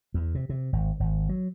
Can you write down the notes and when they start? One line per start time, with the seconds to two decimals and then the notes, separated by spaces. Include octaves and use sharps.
0.14 E2
0.35 C3
0.49 C3
0.73 G#1
1.00 G#1
1.29 F#3